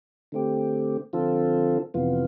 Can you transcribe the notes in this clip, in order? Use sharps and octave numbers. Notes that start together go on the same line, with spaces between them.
D3 A3 C4 G4
D3 F3 C4 F4 A4
F2 C3 E3 B3 F4